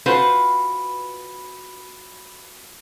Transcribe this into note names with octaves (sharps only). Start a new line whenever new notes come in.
F4 F#4 B4 C5